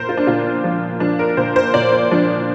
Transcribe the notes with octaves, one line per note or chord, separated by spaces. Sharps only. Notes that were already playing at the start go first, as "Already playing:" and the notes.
Already playing: A#2 F3 A#4 C5
F4
D4
A#2 F4
F3
F3 D4
A#4
A#2 C5
C5
A#2 D5
C5
F3 D4